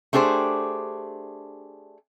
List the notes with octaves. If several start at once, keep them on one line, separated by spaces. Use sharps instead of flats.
A3 D4 G4 G#4 C5